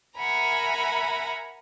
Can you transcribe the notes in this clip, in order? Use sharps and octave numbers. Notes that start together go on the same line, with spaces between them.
A#4 E5 F#5 G#5 A#5 B5